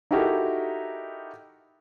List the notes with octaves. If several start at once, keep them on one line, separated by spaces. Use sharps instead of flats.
D#4 E4 F#4 G4 A4 A#4